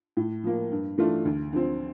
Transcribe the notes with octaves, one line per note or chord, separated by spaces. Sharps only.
A2
F3 A#3
G2
E3 A3 D4 F4
D2
D3 F3 C4